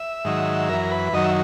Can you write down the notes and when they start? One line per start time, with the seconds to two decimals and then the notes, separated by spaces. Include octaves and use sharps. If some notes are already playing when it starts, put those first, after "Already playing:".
Already playing: E5
0.25 G#2 D#3 F#3
0.69 F#2 E3 A#4
0.91 B4
1.13 F#2 D#3 F#3 D#5
1.24 E5